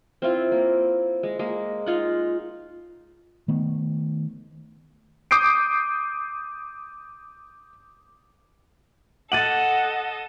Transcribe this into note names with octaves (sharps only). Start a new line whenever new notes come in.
C4 E4 F4
A#3
G#3
G#3 A#3
D#4 F4 F#5
D#3 A3 B3
D6 D#6 G6 C7 D7
A4 D#5 F#5 A6 D#7 F#7